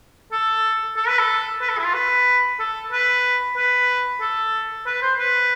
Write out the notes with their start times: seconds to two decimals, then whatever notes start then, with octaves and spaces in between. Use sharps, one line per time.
0.32 A4
0.97 A4
1.08 B4
1.19 A4
1.62 B4
1.69 A4
1.78 E4
1.86 F4
1.94 B4
2.59 A4
2.92 B4
3.57 B4
4.21 A4
4.86 B4
5.02 C5
5.18 B4